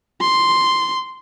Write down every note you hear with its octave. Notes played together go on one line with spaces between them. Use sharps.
C6